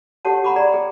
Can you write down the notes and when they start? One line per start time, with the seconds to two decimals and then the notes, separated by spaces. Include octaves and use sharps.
0.25 G4 A4 C#5 F#5 A5
0.44 F#5 A#5 B5 C#6 D6
0.56 G#4 D5 A#5
0.72 G#4 G5